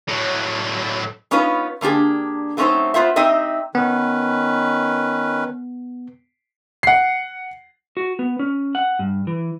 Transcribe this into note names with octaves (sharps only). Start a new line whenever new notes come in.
A2 F#3
B3 C#4 D#4 F4 B4
D3 A#3 D4 G4 G#4
F#3 A3 C4 C#4 D#4 C5
B3 F4 C5 E5
C4 D#4 G4 D#5 E5
D#3 B3 C#4 B4
F#5 C7
F#4
B3
C#4
F#5
G2
E3